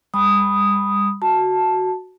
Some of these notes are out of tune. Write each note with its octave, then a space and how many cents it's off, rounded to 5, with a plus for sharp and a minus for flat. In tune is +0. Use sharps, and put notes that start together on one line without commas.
G3 +35 B5 +0 D#6 +0
F#4 +0 A5 +0